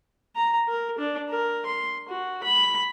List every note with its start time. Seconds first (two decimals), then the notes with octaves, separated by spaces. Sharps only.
0.36 A#5
0.68 A#4
0.99 D4
1.30 A#4
1.66 C6
2.09 F#4
2.43 B5